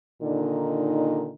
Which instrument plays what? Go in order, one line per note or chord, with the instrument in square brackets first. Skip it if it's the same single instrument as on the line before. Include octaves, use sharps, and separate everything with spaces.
[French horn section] A#2 D3 D#3 D#4